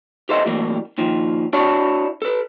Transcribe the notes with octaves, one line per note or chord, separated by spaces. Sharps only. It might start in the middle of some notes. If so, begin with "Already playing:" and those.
G4 A4 C5 D#5 E5
A2 E3 F#3 G3 A#3
A#2 D#3 F3
D4 E4 F#4 C#5 D5 A5
A4 B4